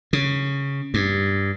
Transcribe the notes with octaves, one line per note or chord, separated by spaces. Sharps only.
C#3
G2